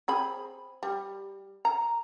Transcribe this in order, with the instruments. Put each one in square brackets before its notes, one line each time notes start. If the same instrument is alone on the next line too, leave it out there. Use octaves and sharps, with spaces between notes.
[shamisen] C4 G#4 B5
G3
A#5